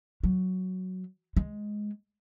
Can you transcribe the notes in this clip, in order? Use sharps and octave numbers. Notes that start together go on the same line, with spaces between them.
F#3
G#3